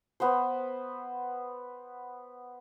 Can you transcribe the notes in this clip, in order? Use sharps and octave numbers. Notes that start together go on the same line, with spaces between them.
B3 B4 C5